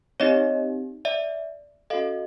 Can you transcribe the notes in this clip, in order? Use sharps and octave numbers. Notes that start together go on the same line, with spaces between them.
C4 D#4 G4 C#5 D#5
D5 E5
C#4 F#4 A4 D#5 F5